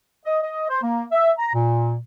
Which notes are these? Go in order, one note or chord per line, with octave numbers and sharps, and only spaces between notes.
D#5
D#5
C5
A#3
E5
A#5
A#2